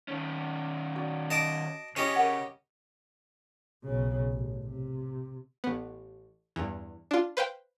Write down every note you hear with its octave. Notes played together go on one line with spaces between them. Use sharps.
D#3 C#4
F#4 D5
D#5 A5 D6
C#3 C#4 G4 D#5
A#4 F#5
B1 C#3
A1
C3
A1 B3
E2 G2
D4 F4
B4 C5 F5 G5